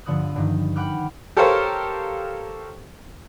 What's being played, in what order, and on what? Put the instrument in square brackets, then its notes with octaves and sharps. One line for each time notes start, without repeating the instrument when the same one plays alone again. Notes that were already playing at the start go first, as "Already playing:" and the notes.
[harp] G2 D3 F3 B3 D#6 F#6
G2 D#3
F#5 G5 B5 D6 F6 F#6
[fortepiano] G4 A4 A#4 C5 C#5 F5